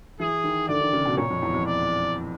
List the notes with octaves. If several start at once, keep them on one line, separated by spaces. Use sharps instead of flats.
E3 G#4
D#3
D3 D5
D#3
C#3
B2
A#2 C#5
F2
E2
F2
D5